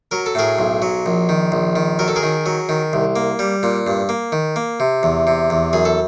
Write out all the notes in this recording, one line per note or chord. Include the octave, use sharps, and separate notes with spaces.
F#3 A#4
A4
A2 G#4 A#4
B1
F#3
A#1
D#3
A#1
D#3
F#3 A#4
A4
G#4 A#4
D#3
F#3
D#3
C2
A#3
G3
A#2
G2
A#3
D#3
A#3
C3
E2
C3
E2
F#2 G#4
A4